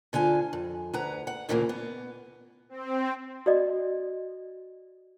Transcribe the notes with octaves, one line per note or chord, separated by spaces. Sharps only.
D2 D3 F4 G#5
F2
D2 B4 F#5 A#5
F#5
D2 A#2 C#3 E3 A3 A#3
B3
C4
F#4 D5 D#5